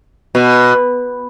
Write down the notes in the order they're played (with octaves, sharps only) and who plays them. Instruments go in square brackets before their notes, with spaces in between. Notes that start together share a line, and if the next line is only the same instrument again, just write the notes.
[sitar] B2